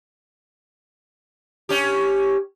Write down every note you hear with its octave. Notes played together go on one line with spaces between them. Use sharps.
C#4 G4